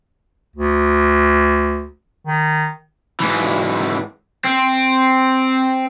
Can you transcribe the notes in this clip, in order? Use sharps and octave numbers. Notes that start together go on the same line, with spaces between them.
D2
D#3
G#2 E3
C4